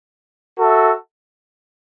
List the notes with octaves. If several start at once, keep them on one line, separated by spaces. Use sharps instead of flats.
F#4 A4 E5